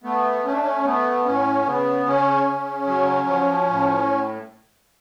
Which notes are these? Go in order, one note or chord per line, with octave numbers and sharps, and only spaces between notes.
A3 B3
A3 C#4
D4
C#4
A3 B3
A2 C#4
C#3 B3
C#3 C#4
C#3
F#3
F3
A2